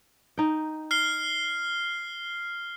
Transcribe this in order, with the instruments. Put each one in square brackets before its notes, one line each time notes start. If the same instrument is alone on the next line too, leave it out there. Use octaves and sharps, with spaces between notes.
[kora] D#4 G5
[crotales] F6 C7 G7